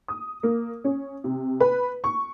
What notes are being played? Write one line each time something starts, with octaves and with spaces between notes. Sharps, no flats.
D#6
A#3
C#4
C3
B4
C#6